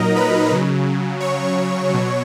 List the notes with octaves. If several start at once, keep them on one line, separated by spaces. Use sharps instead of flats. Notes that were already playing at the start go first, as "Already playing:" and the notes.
Already playing: A#2 F#3 D#4 A#4 D#5 A#5
B4 B5
C#3 F#3
C#5 C#6
B2 F#3